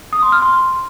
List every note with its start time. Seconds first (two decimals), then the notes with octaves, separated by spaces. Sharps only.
0.13 D#6
0.22 C6
0.32 F6
0.42 C6